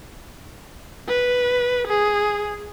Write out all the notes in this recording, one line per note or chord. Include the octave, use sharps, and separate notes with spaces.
B4
G#4